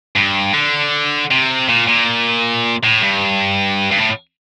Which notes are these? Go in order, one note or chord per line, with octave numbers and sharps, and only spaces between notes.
G2
D3
C3
A#2
A#2
A2
G2
G2
A2